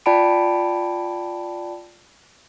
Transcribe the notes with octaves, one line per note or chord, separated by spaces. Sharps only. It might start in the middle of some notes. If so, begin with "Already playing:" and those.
F4 D5 G5 A5 B5 D7